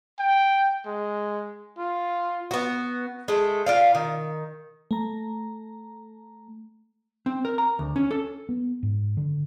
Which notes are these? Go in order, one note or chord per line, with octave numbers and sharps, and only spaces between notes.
G5
G#3
F4
B3 F#4
G#3 A3
F4 D5 F5
D#3
A3 A#5
C4
A#4
A#5
D2
C#4
A4
B3
G#2
D3